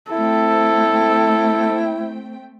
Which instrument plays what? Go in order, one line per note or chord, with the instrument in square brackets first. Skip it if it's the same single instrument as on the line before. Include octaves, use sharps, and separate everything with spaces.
[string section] A3 C4 G5 [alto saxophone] E4 [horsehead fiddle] A4